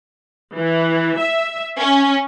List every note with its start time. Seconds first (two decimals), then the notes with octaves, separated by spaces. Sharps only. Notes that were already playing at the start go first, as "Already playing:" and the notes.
0.56 E3
1.19 E5
1.78 C#4